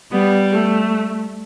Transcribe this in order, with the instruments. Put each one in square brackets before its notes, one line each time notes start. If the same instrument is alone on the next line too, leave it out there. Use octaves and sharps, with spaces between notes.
[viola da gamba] G3 [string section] B3
[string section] A3